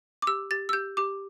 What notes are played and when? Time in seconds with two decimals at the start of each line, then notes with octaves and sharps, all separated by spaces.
0.22 D6
0.27 G4 E6
0.51 G4 A6
0.69 E6
0.73 G4 G6
0.97 G4 D6